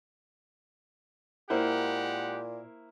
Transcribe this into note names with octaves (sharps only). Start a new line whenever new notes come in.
A#2 G#3 A#3 E4 G4 C5 F#5